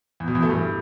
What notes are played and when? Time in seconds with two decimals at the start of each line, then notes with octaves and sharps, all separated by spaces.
0.20 E2
0.28 B2
0.35 E2
0.43 A3
0.50 G2